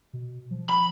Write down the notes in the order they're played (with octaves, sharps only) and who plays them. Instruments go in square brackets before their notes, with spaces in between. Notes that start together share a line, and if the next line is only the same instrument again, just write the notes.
[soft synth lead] B2
F3
[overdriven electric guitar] B5